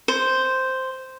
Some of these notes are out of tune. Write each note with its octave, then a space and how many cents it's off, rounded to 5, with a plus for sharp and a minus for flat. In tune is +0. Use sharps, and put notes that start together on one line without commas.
C5 -5